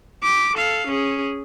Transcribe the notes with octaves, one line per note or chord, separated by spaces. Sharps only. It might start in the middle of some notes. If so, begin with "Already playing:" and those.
D6 B6
A4 F5
C#4 G#4